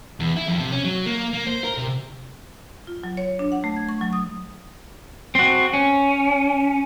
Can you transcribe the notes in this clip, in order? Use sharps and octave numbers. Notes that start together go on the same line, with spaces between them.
E2
E4
F2
C3
C#4
F#3
A#3
A#3
C5
A#4
C3
F4
F#3
C#5
D4
F#5
A3
G#6
C#6
F#3
D#6
C4 F#4
C#4